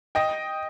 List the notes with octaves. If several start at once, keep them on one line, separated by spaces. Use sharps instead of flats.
D#5 G5